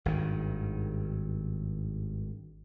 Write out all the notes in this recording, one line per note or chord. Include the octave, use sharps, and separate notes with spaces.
G#1 G2 D#3